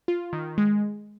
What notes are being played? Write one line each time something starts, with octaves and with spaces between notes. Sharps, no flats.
F4
D#3
G#3